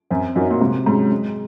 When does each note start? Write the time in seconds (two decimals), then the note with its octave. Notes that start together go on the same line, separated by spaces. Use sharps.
0.10 F#2 C4
0.35 F#2 D#4 F#4 A#4 C#5
0.51 A#2
0.60 G#2 C3
0.86 G#2 F#3 C#4 G#4
1.12 G#3